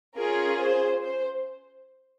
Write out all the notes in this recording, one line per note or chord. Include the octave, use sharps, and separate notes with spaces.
C#4 F4 G#4 A#4
C5
C5